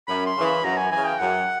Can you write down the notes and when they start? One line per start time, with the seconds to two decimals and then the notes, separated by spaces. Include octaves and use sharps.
0.08 F#2 B5
0.26 C6
0.36 C#3 E3
0.45 B5
0.64 F#2 A#5
0.77 G#5
0.91 C#3 E3 G#5
1.06 G5
1.19 F#2 F#5